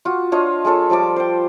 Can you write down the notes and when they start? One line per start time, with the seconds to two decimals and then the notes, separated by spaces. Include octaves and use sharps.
0.05 F4 F#4
0.32 D4 F4 C#5 D#5
0.65 G#3 F4 A4 C#5
0.90 F3 G3 A4 D6
1.16 C5 G5